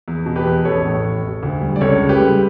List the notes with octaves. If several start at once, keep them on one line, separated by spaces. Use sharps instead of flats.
E2
B2
G4 B4
E2
A1 A4 C#5
A2
A1
E1
D2
G3
D5
C#2 A4 C#5
C#3
G4 B4
G3